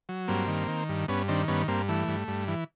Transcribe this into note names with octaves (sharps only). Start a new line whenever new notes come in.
F#3
G2 A#3 C4
D#3
D#3
G2
G2 B3 C#4
D#3 C4 D4
G2 B3 C#4
G2 A#3 C4
E3 A3
G2
G2
E3